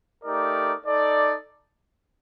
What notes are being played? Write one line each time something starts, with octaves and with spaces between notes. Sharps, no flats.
A3 D#4 G4 A#4 D5
D#4 A4 D5